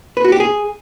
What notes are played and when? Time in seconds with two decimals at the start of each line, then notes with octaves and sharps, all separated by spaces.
0.17 B4
0.25 F#4
0.32 G4
0.40 G#4